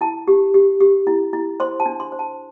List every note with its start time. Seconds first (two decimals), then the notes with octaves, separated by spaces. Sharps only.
0.01 E4 A5
0.28 G4
0.54 G4
0.81 G4
1.07 E4
1.33 E4
1.60 C5 C6
1.80 A5
1.86 D4
2.00 C6
2.12 C5
2.19 A5